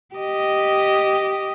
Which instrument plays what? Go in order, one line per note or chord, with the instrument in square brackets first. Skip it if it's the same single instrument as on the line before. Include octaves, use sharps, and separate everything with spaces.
[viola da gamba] G4 D#5